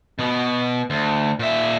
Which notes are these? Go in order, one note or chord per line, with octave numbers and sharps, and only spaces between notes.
B2 B3
D2
A#2 E5